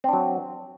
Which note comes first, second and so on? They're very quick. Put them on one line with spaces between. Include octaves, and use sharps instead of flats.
C4 D4 F#3